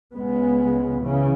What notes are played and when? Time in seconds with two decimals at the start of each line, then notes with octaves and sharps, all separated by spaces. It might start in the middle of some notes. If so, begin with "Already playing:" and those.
0.15 C#2 C#3 G#3 B3
1.03 C#3 E3